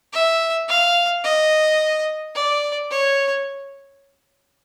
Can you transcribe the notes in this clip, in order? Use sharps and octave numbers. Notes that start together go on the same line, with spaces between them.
E5
F5
D#5
D5
C#5